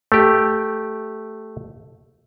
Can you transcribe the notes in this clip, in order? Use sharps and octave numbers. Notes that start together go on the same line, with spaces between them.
A3 G4